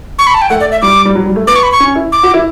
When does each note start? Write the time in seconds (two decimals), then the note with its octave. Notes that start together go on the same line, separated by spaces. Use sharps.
0.19 C#6
0.27 B5
0.34 A5
0.42 G5
0.50 A3 F#5
0.61 D5
0.72 E5
0.82 G3 D6
1.05 G3
1.15 F#3
1.26 G3
1.36 A3
1.47 B3 D6
1.56 C#6
1.63 B5
1.72 C#6
1.80 C#4
1.95 E4
2.12 D6
2.23 F#4
2.34 E4